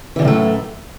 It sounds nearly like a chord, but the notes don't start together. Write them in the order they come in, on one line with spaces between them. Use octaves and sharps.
E3 D3 F#2 A2 A3